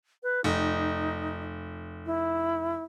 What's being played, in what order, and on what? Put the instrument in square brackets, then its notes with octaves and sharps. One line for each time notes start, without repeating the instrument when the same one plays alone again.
[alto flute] B4
[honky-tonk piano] F1 [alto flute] D#4
[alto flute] E4